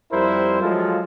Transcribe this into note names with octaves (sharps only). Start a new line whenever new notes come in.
F2 G3 E4 A#4 C5
F3 F#3 G#3 F4 A4